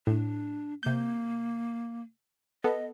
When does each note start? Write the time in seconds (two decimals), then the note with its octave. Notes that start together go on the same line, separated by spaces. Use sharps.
0.07 A2 D4
0.83 C3 A#3 G6
2.64 B3 A4 D#5